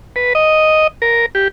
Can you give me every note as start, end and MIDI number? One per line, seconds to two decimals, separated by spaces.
0.16 0.33 71
0.35 0.87 75
1.02 1.26 70
1.35 1.48 67